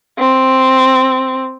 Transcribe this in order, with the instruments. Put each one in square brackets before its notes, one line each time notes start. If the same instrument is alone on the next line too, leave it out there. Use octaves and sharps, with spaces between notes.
[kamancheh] C4